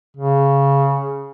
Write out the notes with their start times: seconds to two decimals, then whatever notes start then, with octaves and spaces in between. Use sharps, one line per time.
0.17 C#3